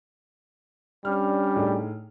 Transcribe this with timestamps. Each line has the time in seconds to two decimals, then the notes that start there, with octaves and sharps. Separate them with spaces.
1.05 G3 C#4 D4 F6
1.56 A2 D#4 G#4